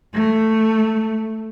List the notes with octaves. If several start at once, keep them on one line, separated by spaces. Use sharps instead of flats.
A3